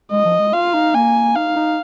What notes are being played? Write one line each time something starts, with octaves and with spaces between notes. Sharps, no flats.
G#3 D#5
F3
G#3
F4 F5
D#4
A#3 G#5
D#4 F5
D#4